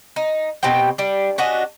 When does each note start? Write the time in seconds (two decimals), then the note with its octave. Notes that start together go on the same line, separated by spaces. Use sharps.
0.16 D#4
0.63 B2 C4 G4 G5
0.98 G3 D4
1.38 C#4 D4 F#4 D#5